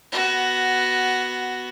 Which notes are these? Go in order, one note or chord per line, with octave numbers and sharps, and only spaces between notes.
B3 F#4